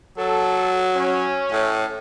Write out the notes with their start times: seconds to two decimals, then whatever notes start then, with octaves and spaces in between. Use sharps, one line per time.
0.18 F#3 A4
0.96 C#4
1.52 A2